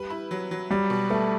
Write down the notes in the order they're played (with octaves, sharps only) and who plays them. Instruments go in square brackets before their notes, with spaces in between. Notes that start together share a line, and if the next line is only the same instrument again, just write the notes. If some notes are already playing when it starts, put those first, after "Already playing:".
Already playing: [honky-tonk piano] G3 B4
E4
F#3
F#3
[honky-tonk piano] F#3 [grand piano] G3
[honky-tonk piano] B2
[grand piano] A3 [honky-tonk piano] B3